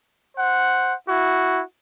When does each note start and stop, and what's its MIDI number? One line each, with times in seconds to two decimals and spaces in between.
0.37 0.94 72
0.37 0.94 78
1.08 1.62 64
1.08 1.62 66